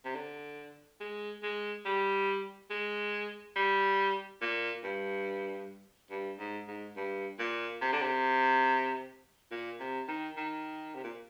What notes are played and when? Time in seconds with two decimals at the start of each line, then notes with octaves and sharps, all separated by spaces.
0.05 C3
0.15 D3
1.01 G#3
1.43 G#3
1.85 G3
2.71 G#3
3.56 G3
4.42 A#2
4.83 G2
6.11 G2
6.40 G#2
6.68 G#2
6.97 G2
7.39 A#2
7.81 C3
7.92 D3
8.02 C3
9.51 A#2
9.80 C3
10.09 D#3
10.37 D#3
10.95 C3
11.04 A#2